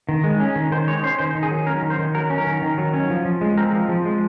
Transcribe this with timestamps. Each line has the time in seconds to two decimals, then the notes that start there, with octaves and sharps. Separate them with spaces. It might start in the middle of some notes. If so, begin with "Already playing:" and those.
0.09 D#3
0.24 G#3
0.40 C#4
0.56 D#3
0.72 D#3 C5
0.87 G#3 C#5
1.03 C#4 C5
1.19 D#3 C5
1.35 D#3
1.43 G#4
1.51 F#3
1.66 C#4 A#4
1.82 D#3
1.90 C5
1.99 D#3
2.14 F#3 A#4
2.30 C#4
2.38 A#4
2.47 D#3
2.62 D#3
2.78 F#3
2.94 C#4
3.10 F3
3.25 F3
3.41 G#3
3.58 C4 A#4
3.73 F3
3.89 F3
4.05 G#3